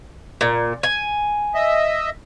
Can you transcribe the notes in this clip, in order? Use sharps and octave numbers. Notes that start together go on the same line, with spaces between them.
A#2
G#5
D#5 E5